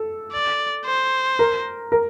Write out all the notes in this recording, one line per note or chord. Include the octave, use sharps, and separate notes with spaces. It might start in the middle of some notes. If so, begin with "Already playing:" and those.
Already playing: A4
D5
C5
A#4
A#4